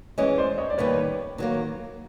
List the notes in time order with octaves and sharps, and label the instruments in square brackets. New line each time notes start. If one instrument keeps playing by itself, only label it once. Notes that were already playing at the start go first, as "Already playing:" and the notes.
[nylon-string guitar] E3 G#3 C#4 [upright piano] C#5 D#5
[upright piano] C5 D5
C#5 D#5
D5
[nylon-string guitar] D#2 D#3 G3 B3 [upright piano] B4 C#5
[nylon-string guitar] D#3 F#3 A#3